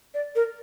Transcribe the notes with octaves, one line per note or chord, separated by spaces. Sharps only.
D5
A#4